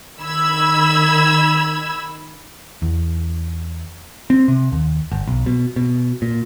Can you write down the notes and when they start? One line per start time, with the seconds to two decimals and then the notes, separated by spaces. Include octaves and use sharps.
0.19 D#3 B5 E6 G#6
2.82 E2
4.30 C4
4.48 C3
4.72 D#2
5.12 G1
5.27 B1
5.46 B2
5.76 B2
6.22 A#2